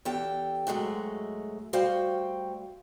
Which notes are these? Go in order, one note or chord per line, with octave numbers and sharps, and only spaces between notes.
E2 G4 A4 G5
G#2 F#3 G#3 A3
G3 A3 F#4 C5 F5 G5